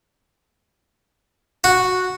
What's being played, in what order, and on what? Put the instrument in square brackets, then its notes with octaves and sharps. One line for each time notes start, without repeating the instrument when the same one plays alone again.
[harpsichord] F#4